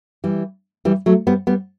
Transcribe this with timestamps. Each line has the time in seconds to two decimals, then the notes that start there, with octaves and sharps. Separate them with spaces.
0.24 E3 G3
0.85 E3 G3
1.06 F#3 A3
1.27 G3 B3
1.47 G3 B3